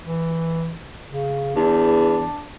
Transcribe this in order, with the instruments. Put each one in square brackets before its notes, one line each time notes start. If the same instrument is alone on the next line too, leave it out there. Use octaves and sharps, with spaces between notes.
[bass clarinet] E3
C#3
[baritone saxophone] E2 [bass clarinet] D4